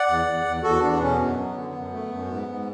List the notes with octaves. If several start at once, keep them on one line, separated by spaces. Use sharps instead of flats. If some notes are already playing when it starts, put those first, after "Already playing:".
Already playing: D5 F#5
E2
E2
E2
E2 F#4 A4
E2 B3 D4
B2 C#4
F#2 B3
F#3
D3
F#2
A3
F#2
G#2
G#2